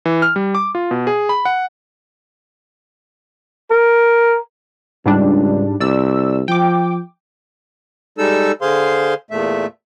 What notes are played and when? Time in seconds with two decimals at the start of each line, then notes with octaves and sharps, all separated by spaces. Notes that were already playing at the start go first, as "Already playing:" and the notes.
0.05 E3
0.22 F6
0.36 G3
0.55 D6
0.75 F4
0.91 B2
1.07 G#4
1.29 B5
1.45 F#5
3.70 A#4
5.06 C#2 G#2 G3 D4
5.80 C2 D5 E6
6.48 F3 G5 D6
8.18 G3 G#3 D#4 A4 E6
8.62 D3 G#4 C5 F5 C6
9.31 E2 A#2 A3 E5